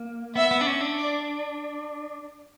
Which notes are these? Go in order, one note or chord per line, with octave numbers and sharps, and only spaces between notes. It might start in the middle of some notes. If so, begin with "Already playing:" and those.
Already playing: A#3
B3 E5
B3
D4
C#4
D4
D5